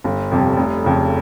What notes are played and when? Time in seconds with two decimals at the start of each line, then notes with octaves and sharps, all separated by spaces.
0.04 G1
0.31 F2 C3 G3
0.57 F1
0.84 F2 C#3